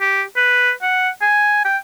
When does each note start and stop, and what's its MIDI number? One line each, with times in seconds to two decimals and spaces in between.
0.01 0.23 67
0.36 0.71 71
0.82 1.09 78
1.22 1.63 80
1.65 1.77 79